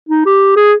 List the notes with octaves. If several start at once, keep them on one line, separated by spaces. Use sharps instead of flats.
D#4
G4
G#4